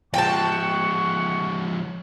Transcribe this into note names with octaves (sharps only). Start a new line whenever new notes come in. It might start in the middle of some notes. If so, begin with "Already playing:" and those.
F3 G#3 F#5 G5 A5 C#6